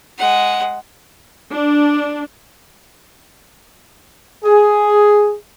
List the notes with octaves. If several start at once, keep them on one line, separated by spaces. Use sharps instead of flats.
G#3 F#5
D4
G#4